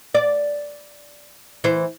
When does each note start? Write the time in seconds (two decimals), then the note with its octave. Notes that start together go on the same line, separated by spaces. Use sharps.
0.15 D5
1.64 E3 C5